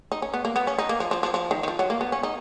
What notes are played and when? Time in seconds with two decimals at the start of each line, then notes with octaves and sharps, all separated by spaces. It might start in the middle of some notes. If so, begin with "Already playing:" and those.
0.12 D#4
0.22 C#4
0.34 B3
0.45 A#3
0.56 B3
0.67 C#4
0.78 D#4
0.89 A#3
1.00 F3
1.11 F3
1.23 F3
1.34 F3
1.51 D#3
1.63 D#3
1.68 F3
1.79 F#3
1.90 A#3
2.01 B3
2.12 C#4
2.23 D#4